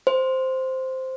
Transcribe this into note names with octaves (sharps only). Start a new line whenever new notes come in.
C5